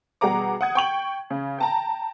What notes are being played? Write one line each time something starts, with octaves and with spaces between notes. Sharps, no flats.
B2 G3 G#4 F#5 A#5 D6
F#5 D#6 G#6
G5 C#6 F#7
C#3
G5 A5 A#5